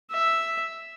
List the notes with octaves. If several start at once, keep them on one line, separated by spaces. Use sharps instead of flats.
E5